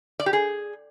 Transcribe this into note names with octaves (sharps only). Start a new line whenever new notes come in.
D5
G4
G#4